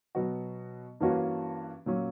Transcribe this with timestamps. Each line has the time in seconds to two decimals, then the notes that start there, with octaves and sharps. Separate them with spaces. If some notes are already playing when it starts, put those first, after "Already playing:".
0.15 B2 F#3 B3 F#4
1.00 G2 E3 A#3 C#4 F#4
1.86 A#2 F#3 C#4